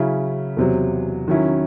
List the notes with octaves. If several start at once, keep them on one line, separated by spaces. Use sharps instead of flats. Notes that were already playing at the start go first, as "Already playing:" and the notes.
Already playing: C#3 F#3 C#4 E4
E2 C3 F#3
D#3 F#3 C#4 E4